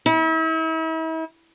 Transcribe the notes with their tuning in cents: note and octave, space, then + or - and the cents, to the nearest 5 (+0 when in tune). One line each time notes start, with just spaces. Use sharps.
E4 -40